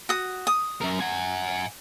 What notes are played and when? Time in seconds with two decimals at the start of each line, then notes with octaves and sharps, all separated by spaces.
0.09 F#4 D#6
0.47 D#6
0.81 F#2 A#4
1.01 F#5 G#5